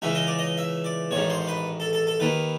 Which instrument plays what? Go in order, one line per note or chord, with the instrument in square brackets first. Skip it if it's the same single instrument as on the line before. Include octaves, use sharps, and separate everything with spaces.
[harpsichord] C#2 C#3 E3 E5
D#5
D5
D#5
E5
D5
A1 G#2 D#3 C#5
C5
B4
A4
A4
A4
D#2 D#3 B4